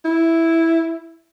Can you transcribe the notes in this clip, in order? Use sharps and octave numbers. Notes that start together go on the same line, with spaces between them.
E4